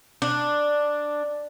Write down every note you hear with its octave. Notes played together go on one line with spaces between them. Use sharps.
D4